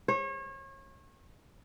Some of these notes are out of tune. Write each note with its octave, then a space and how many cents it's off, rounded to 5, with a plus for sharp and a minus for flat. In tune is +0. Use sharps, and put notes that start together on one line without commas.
C#5 -35